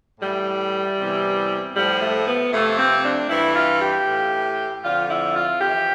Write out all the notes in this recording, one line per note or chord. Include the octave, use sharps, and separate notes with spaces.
A2 E3 G3
E2 C3 E3
A2 F3 G3
A3
B3
F2 C3 F3 A3
C4
D4
G2 E3 E4
F4
G4
A2 E3
F2 D3 F3 F4
E4
F4
F2 E3 G4